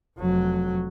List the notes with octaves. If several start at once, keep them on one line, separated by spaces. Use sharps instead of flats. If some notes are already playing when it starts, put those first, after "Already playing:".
F1 F#3